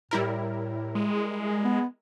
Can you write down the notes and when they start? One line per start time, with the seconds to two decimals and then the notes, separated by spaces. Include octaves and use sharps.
0.11 A2 G3 E4 A#4
0.95 G#3
1.64 B3